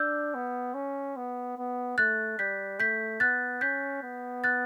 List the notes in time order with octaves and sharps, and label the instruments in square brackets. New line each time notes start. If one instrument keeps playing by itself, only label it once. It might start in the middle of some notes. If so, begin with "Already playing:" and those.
Already playing: [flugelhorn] D4 [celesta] E6 G6
[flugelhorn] B3
C#4
B3
B3
[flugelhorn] A3 [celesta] F#6 A6
[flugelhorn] G3 [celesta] G6 B6
[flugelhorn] A3 [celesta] G6 B6
[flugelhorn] B3 [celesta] F#6 A6
[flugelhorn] C#4 [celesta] G6 B6
[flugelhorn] B3
[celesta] F#6 A6